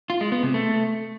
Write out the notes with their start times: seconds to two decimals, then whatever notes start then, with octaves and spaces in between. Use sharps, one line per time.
0.10 F4
0.21 G#3
0.32 B3
0.43 C3
0.54 A3